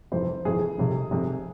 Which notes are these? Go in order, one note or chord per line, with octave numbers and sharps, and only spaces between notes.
F1 F2 E3 C5
F1 F2 E3 G#4
F1 F2 C3
F1 F2 C3